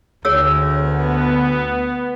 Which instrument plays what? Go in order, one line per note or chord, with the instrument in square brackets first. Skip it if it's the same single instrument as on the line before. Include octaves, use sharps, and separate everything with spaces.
[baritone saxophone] D2 [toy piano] G#4 C#5 E6
[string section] B3